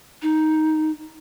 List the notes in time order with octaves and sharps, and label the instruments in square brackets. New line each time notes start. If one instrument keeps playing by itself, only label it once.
[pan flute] D#4